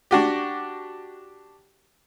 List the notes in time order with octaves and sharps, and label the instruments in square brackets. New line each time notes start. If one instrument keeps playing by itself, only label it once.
[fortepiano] D4 F#4 G4